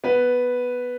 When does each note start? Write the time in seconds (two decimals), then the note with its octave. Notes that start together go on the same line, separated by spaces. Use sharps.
0.04 B3 B4